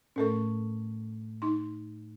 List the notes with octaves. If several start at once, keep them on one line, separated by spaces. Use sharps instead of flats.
A2 A3 C#4 A4 A#4 C#6
D#4 C6